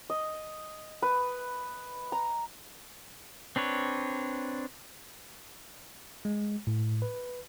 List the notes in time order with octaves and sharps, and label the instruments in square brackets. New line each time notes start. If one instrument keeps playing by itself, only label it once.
[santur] D#5
B4
A#5
[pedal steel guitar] C4 D4 B4 C#5
[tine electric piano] G#3
A2
B4